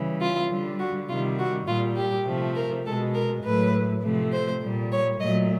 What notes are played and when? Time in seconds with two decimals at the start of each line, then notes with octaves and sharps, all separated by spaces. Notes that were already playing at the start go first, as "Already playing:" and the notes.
Already playing: C#3 E3 G3
0.21 F4
0.50 D3 G3
0.79 F#4
1.09 C3 D#3 G3 F4
1.39 F#4
1.67 A#2 G3 F4
1.96 G4
2.26 C3 F3 A3
2.56 A#4
2.86 B2 G#3 A4
3.14 A#4
3.44 A2 F#3 A3 B4
4.03 C3 F3 A3
4.32 C5
4.62 A#2 G3
4.92 C#5
5.20 A#2 F#3 A3 D#5